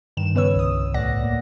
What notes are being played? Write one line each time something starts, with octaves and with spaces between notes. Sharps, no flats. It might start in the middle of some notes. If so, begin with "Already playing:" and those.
G2 D#3 E7
C#3 B3 B4 C#5 E6
C2 D#6
D2 A2 D5 F#5 A#6
A#3